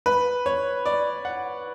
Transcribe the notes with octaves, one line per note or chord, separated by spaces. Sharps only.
B4
C#5
D5
F#5